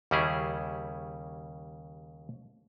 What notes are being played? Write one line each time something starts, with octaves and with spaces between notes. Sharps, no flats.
D#2 C#3 G3 C#4 E4 G#4